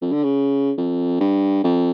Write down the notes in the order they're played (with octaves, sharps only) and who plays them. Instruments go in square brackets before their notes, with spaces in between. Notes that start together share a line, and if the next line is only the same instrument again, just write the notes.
[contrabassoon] F2
D3
C#3
F2
G2
F2